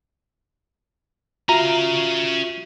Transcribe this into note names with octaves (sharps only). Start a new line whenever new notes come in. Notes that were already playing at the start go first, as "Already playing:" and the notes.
C#4 F4 F#4 E5 F5 A#5